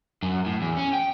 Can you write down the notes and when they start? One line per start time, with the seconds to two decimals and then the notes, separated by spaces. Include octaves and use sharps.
0.23 F#2
0.46 A2
0.61 E2
0.77 C#4
0.93 G5